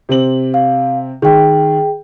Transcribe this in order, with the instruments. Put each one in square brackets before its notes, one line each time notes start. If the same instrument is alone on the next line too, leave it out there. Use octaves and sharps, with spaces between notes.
[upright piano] C3 C4 F#7
[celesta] F5
[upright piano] D#3 [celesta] G#4 G5